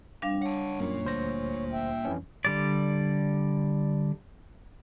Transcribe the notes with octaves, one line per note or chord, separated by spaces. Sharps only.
F2 G3 D4 F5
C#5 F#5 A5
F#2 A#3 F4
D2 C5 A#6
E5 G5
F2 E3 C#4
D3 G3 D5